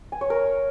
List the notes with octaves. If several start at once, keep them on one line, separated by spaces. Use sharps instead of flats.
G#5
C#5
A#4